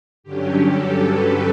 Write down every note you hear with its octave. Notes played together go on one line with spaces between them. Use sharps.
G2 D3 F#3 C#4 G4
A4
B4